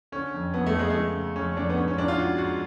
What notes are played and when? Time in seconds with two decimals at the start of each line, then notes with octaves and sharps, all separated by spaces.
0.12 D3 C#4
0.34 F2
0.54 F2 B3
0.67 A3
0.74 F2 G#3
0.90 C#3 A3
1.15 C#3
1.36 F2 C#4
1.56 F2 D4
1.70 B3
1.77 G#2 C#4
1.88 C#4
1.98 G#2 D4
2.08 F4
2.18 G#2 F#4
2.38 G#2 F#4